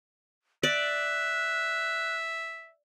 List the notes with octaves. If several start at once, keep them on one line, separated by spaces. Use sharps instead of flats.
D5 E5 F#6